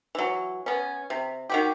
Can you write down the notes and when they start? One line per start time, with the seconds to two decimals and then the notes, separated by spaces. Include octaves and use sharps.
0.15 E3 F#3
0.66 B3 C#4
1.10 C3
1.49 D#3 F#4 G4